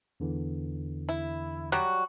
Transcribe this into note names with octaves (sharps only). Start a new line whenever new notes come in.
E2 D3 E3
E4
F#3 G3 F#4